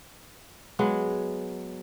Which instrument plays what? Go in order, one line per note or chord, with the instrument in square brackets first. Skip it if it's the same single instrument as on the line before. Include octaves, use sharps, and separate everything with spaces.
[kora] F#3 G#3 B3